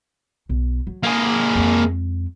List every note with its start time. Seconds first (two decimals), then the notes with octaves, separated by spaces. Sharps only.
0.49 B1
0.87 F#3
1.03 A#3 G#4
1.56 F2 G#3